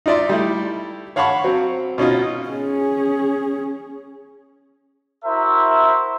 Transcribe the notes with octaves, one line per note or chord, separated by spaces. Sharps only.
D#4 F4 D5 E5 C6
G3 A3 E4
C#5 F5 F#5 A5 B5 C#6
F#3 C4
B2 C#4 D#4 F4
C#4 G#4
E4 F#4 A#4 C5 E5